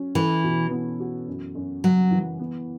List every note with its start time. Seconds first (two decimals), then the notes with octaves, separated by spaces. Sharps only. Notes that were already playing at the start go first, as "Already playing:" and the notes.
Already playing: F#3 C#4
0.15 E3 A4
0.44 B2
0.71 B3
1.00 F#4
1.27 F#2
1.55 F#2
1.84 C#3 F#3
2.11 E3
2.39 B3